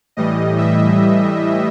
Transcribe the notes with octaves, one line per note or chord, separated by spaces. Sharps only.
A2 E3 G3 D#5
E5